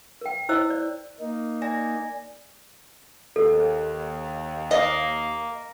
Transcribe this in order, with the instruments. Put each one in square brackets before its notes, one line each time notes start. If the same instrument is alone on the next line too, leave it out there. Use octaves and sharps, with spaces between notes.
[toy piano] A#4 G5
E4 C5 D#5 E6
D5
[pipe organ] A#3 D#4
[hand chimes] D5 G#5 A#6
[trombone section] D#2 [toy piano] A4
[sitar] A#3 [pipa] D#5